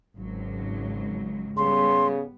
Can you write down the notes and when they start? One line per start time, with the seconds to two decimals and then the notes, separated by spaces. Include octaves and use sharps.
0.17 G#1 C#2 F#3
1.57 C#3 G3 B3 C6